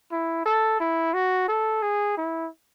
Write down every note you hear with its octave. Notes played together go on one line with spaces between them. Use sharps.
E4
A4
E4
F#4
A4
G#4
E4